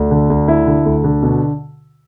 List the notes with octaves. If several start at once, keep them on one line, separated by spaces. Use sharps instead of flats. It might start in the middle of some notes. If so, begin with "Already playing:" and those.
Already playing: D2
D3
D2
E4
D3
D2
D3
B2